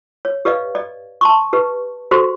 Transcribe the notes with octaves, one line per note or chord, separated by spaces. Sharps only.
C#5
G4 B4 D5 D#5 F5
D5 D#5
A5 C6 C#6
G4 B4 D#5
F#4 G4 A4 C5 C6